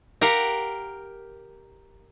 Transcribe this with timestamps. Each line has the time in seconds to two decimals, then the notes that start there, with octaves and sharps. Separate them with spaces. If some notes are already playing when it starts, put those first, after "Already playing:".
0.21 G4 A#4 F5 F#5